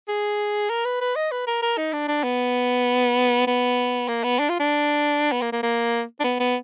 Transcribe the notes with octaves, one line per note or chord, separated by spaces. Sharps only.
G#4
A#4
B4
B4
D#5
B4
A#4
A#4
D#4
D4
D4
B3
B3
A#3
B3
D4
F4
D4
B3
A#3
A#3
A#3
D4
B3
B3